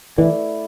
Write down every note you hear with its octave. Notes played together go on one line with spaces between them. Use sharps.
E3 A3 E4 B4 D5